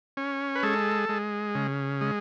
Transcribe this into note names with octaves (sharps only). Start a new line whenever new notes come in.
C#4
B4
G#3 A4
G#3
C#3
G#3